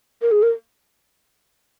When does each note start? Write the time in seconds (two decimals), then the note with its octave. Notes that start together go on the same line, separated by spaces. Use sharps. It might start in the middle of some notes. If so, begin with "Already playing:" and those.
0.22 A#4
0.31 G#4
0.43 A#4